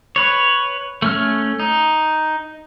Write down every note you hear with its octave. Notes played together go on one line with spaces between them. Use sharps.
B4 C#5
A3 C#4 F6
D#4